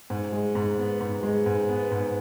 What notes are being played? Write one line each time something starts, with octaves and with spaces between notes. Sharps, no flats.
G#2
G#3
G#2
B3
G#2
G#3
G#2
B3
G#2